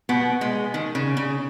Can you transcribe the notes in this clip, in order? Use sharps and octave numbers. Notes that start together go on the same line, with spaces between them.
B2 B3
G#3
D#3
C#3
C#3